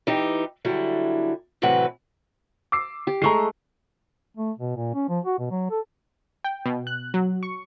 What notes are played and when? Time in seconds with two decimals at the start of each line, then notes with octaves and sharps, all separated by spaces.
0.07 E3 D#4 G4
0.65 D3 F#3 G3 E4
1.62 A2 C3 E3 F#3 B4 F#5
2.72 D6 E6 C7
3.07 G4
3.22 G#3 A3 A#5 C#6 C7
4.37 A3
4.59 B2
4.76 A#2
4.95 C#4
5.09 F3
5.25 F#4
5.39 B2
5.51 F#3
5.71 A4
6.44 G5
6.66 B2
6.87 F#6
7.14 F#3
7.43 C#6